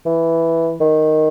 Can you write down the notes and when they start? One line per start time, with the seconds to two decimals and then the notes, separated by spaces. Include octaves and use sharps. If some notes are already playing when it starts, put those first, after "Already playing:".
0.06 E3
0.80 D#3